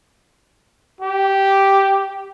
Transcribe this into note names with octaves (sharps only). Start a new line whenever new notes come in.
G4